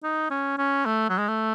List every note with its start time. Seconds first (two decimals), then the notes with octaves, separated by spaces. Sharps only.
0.04 D#4
0.30 C#4
0.58 C#4
0.86 A3
1.09 F#3
1.19 G#3
1.28 A3